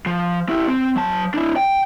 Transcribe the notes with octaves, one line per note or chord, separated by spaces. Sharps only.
F3
E4 G4
C4
F#3 A5
D4 E4
G5